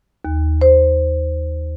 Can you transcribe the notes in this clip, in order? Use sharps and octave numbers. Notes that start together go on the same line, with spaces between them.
D#2
C5